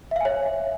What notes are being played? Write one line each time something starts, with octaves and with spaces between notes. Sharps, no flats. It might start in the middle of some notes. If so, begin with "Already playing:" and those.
C#5 E5 F5 G#5